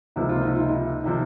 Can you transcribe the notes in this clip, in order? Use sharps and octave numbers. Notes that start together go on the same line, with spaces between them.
C#2 C3 F3 A#3 D#4
F4
D#4
F4
D#4
C3 F3 A#3 D#4